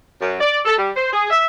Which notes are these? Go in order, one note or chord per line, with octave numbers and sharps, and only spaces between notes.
F#2
D5
A4
G3
C5
G#4
E5